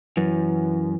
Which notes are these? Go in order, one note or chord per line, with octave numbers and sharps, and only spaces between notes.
F#2 E3